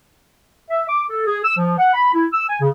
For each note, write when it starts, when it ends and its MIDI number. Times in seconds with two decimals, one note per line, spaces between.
0.70 0.84 76
0.88 1.03 86
1.09 1.24 69
1.27 1.39 68
1.45 1.54 88
1.58 1.75 53
1.78 1.94 78
1.94 2.10 83
2.13 2.25 64
2.33 2.45 88
2.49 2.59 80
2.61 2.69 49